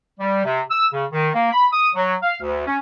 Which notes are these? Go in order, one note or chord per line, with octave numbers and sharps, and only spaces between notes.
G3
C3
E6
C#3
D#3
A#3
B5
D#6
F#3
F5
D2
C#4